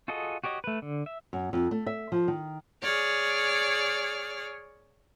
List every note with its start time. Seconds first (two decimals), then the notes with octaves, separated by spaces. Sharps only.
0.08 F4 F#4 G#4 A4 D#5
0.44 F#4 G4 C#5 D#5
0.64 A3 B4
0.82 D3
1.06 E5
1.33 F#2
1.53 F2
1.71 A3
1.86 E5
2.12 F3
2.28 D#3
2.82 G#4 C#5 D5 F6